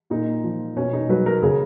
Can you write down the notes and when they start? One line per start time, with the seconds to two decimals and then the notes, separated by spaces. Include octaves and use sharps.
0.10 A#2 D#4
0.44 F3
0.76 B2 C#4
0.93 D#4
1.09 F#3 B4
1.26 A#4
1.42 C#3 G#4